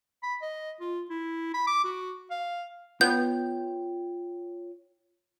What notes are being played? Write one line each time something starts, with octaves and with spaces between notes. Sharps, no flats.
B5
D#5
F4
E4
B5
D6
F#4
F5
B3 F4 C#5 G5 G6